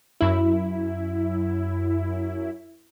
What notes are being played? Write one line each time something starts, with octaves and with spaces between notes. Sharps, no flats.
F#2 E4